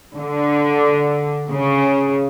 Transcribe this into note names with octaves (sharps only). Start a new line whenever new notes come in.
D3
C#3